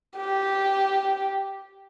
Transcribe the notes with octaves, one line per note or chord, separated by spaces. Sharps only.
G4